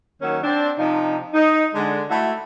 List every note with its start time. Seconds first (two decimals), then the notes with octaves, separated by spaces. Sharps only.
0.21 D#3 F#3 A#3 C#4
0.43 C4 D4
0.78 C3 F3 D#4
1.34 D#4
1.75 D3 G#3
2.09 A3 E4 F#4